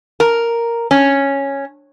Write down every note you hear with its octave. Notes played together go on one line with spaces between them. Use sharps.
A#4
C#4